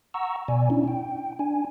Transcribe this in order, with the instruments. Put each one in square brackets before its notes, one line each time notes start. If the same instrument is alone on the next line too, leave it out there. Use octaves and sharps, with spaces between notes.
[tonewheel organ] F#5 A#5 C#6 E6
B2 D5 G#5
C#4 D4 E4
G5
D4 G#5